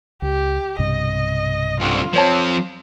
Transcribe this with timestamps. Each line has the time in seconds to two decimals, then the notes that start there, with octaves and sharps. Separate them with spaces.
0.22 C#2 G4
0.79 B1 G2 C3 D#5
1.80 C2 D3 F4
2.13 F3 C4 C5 C#5 A5